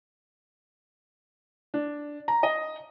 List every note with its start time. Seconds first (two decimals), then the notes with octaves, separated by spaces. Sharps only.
1.74 D4
2.28 A#5
2.43 D#5